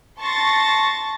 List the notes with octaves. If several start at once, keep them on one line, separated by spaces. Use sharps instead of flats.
A5 C6 C#6 A6 A#6